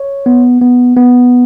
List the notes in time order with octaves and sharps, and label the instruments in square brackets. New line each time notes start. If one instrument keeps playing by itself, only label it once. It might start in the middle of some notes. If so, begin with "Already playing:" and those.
Already playing: [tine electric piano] C#5
B3
B3
B3